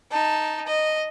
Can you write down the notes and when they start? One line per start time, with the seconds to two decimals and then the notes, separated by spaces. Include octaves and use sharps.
0.11 D#4 A5
0.67 D#5